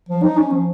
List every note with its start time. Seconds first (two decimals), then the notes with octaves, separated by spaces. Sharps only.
0.09 F3
0.23 D#4
0.37 C#4
0.52 F3